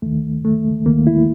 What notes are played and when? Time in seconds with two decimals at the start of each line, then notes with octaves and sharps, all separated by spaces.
0.02 D#2 D#3 A3
0.44 A3
0.86 D#2 D#3 A#3
1.07 E4